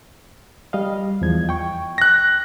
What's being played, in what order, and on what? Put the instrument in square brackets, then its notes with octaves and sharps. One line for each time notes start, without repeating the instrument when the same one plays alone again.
[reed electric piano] G3 D#5 F5
E2 F3 G#6
G5 C#6
[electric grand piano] F#6 A#6